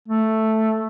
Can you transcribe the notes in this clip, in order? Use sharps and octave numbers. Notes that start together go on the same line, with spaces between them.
A3